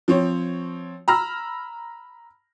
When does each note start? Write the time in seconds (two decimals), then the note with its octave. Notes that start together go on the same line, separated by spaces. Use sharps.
0.08 F3 C4 C#5
1.08 A#5 B5 E6 F6 A#6